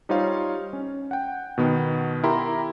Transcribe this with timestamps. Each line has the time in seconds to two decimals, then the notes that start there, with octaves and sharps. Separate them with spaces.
0.09 G3 D#4 F4 C5 C#5 F5
0.73 C#4
1.11 F#5 G5
1.58 B2 D#3 B3
2.24 E4 G4 A#4 G5 A#5 C6